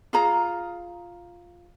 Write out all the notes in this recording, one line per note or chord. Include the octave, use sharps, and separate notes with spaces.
F4 G#4 A#5